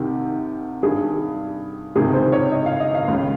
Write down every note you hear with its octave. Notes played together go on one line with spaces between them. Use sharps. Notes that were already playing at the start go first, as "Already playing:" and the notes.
Already playing: C2 C3 D#3 G4
G2 D#3 G#4
C#2 C3 D#3 G#4
C5
C#5
D#5
F5
D#5
F5
C#2 C#3